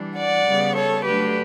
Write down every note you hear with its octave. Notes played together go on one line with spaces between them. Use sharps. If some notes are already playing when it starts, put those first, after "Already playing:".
Already playing: E3 G3 D4
D5 F#5
C#3 G3 B3
A4 C#5
D3 F#3 A3 D4 G4 B4